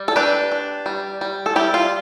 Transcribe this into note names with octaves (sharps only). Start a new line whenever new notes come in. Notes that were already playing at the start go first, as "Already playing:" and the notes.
Already playing: G3
A4
D4 G4 B4
D4
G3
G3
A4
G3 E4 G4
F4